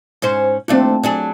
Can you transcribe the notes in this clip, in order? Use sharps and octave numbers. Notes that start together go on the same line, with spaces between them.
G#2 C#4 C5
D#2 A3 C4 D4 F4
F#3 D4 G#4